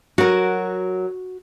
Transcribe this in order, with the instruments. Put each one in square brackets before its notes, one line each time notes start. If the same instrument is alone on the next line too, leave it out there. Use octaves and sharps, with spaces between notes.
[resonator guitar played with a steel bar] F#3 A#4 [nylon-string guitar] F#4